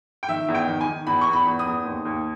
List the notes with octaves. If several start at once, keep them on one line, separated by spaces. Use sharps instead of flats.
G5
D#3 E5
E2
G5
D#3
G#5
D#3
E2 B5
E2 C#6
B5
E2
D#6
E2
D#2
D#2